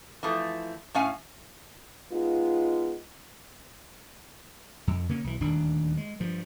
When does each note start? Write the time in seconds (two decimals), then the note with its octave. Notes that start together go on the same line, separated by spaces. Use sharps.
0.23 E3 F3 A3
0.94 A2 C#4 F5 G#5
2.12 G#3 B3 D#4 F4
4.87 F2
5.09 C#3 A#3 C#4
5.24 B1 E3
5.41 D#1 D2 D#3 D4
5.97 G#3
6.20 G2 F3